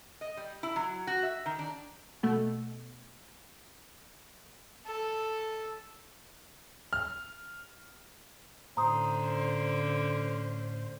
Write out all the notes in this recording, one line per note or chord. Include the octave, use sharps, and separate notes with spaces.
D#5
G3
E4
F#3
F#4
E5
D#3
D4
B2 A3
A4
F6
A2 D3 C#4 C5 A#5 C6 D#6